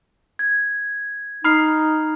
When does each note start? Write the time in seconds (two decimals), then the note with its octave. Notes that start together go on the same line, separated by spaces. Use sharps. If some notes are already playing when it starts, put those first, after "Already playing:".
0.39 G#6
1.44 D#4 B5 F6 C7